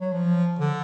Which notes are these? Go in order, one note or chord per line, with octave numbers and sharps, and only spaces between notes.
F#3
F3
D3